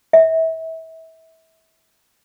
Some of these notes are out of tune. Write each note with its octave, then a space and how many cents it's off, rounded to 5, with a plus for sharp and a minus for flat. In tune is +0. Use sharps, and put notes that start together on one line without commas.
E5 -30